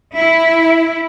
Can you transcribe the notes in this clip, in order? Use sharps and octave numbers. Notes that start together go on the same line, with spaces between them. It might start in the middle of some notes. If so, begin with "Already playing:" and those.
E4